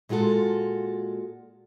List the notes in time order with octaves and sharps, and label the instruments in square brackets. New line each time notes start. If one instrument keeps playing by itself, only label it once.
[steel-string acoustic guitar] A#2 G#3 F4 F#4 A4